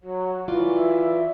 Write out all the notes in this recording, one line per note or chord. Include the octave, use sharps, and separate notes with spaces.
F#3 F#4
E3 F4 D5
E5